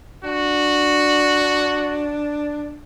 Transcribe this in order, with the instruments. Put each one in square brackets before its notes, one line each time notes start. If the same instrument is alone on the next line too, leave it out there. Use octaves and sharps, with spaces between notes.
[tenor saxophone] D4 [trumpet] F#4